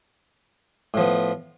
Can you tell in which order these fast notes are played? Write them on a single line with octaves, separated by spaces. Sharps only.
A2 F3 B3